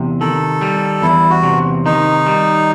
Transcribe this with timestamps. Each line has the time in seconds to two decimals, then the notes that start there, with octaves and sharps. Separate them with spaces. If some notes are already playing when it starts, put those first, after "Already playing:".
Already playing: E2 C3
0.21 D#3 A4
0.61 G3
1.02 E2 E4
1.30 F#4
1.43 C3
1.85 D#3 D#4
2.26 G3